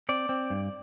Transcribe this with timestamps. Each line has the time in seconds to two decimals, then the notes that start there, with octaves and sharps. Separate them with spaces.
0.09 C4 D5
0.29 C4
0.50 G2